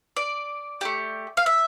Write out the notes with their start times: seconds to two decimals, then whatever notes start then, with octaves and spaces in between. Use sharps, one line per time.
0.16 D5
0.81 A3 D4 G4
1.37 F5
1.46 E5